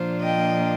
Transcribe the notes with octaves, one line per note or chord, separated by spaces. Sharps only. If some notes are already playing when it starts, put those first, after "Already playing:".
Already playing: A#2 F3 A#3 D4 F4 C5
D#5 G5